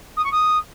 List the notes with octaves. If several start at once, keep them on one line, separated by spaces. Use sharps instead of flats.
D#6
C#6
D#6